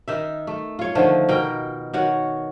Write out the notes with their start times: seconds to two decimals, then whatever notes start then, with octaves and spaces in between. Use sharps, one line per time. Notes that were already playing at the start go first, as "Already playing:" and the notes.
0.08 D#3 D#4 E5
0.47 A3
0.79 F4 C#5
0.95 D3 D#3 F3 A3
1.29 B2 D#4 A#4 G5
1.94 D#3 F#4 C#5